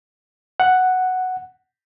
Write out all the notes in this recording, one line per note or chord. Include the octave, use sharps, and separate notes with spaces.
F#5